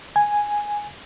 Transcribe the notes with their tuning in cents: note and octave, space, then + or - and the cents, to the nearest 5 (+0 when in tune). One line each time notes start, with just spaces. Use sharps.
G#5 +0